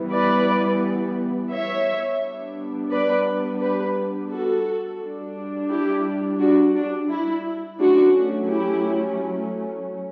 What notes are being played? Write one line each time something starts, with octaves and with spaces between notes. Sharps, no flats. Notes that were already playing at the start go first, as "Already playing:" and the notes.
Already playing: E3 G3 B3
B4 D5
C#5 E5
G3 B3 D4
B4 D5
G4 B4
F#4 A4
G3 D4
E4 G4
D4 F#4
D4
E4
F#3 A3 C#4 D4 F#4
E4 G4